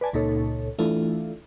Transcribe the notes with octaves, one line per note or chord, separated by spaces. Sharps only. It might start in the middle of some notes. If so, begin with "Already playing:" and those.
B4 D5 G#5 A5
C#2 A#2 D#4 A4 C#5
E3 A3 D4 E4 F4 A4